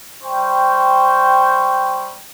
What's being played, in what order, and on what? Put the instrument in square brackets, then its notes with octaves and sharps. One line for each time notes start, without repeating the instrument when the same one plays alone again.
[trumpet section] G3 C5 G5 C#6